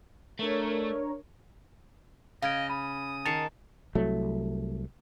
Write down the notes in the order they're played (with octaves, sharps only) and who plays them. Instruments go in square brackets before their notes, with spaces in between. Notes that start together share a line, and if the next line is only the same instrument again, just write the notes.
[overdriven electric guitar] A3 [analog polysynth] D4 A#4 C#5
[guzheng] C#3 [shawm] D#5 [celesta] F5 G#6 D7
[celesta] B5 [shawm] D#6
[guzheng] D#3 [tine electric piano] A5 [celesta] C7 C#7 F7
[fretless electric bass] C2 F#3 A3